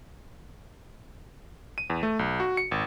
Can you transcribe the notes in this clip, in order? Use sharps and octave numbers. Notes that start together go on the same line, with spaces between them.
D#7
E2
A3
B1
F#4
C#7
G#1